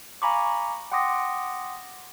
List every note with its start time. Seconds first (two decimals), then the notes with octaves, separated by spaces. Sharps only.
0.22 F5 G#5 A#5 B5 C#6 D6
0.92 F#5 G5 C6 D6 D#6 A#6